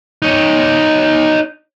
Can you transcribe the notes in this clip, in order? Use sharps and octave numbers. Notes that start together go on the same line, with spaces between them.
D#4 C#5